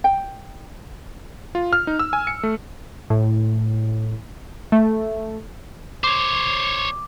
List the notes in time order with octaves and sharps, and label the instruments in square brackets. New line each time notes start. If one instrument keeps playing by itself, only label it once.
[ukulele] G5
[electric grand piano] F4
F6
D#4
E6
G#5
C#7
A3
[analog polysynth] A2
A3
[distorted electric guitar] C5 C#5 [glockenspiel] D6